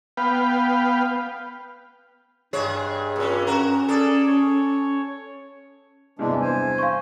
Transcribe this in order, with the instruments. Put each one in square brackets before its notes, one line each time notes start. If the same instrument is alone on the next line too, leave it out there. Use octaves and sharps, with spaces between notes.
[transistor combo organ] B3 B4 F5 G5
[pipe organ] G2 [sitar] G#3 G#4 C#5
[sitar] A#2 C#4
[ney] C#4 [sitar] F#4 A#4
[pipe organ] G#4 D5 [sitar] A4
[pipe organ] C#5
[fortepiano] E2 G2 C3 [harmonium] E3 G#3 D4
[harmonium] C5 G#5
[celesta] F5 C6 C#6